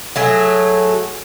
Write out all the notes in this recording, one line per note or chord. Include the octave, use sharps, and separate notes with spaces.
F#3 A3 G#4